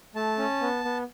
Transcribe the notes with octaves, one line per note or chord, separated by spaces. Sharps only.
A3 A5
C#4
B3
B3